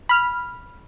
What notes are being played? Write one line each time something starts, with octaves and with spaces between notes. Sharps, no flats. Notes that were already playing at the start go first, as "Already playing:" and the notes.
B5 F6